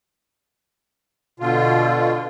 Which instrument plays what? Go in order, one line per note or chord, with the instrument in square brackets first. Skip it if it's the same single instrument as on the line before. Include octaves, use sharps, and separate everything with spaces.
[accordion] B2 D3 F4